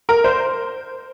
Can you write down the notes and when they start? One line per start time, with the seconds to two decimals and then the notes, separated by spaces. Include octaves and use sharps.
0.09 A#4
0.24 C5